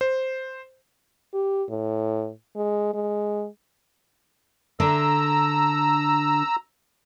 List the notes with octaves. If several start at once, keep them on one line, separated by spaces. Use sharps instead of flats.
C5
G4
A2
G#3
G#3
D3 D4 A#5 E6